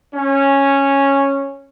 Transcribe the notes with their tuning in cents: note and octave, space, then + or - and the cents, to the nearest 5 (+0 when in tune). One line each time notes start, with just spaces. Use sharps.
C#4 -5